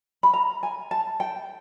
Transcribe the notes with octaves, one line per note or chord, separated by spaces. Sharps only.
B5
A#5
G#5
A5
G5